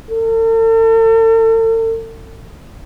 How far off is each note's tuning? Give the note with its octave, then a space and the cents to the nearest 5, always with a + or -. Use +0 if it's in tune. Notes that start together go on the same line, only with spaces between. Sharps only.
A4 +45